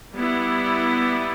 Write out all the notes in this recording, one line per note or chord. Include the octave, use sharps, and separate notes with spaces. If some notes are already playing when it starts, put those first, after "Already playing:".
G3 B3 E4